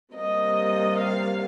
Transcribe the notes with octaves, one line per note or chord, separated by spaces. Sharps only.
C3 G3 A#3 D#5
F5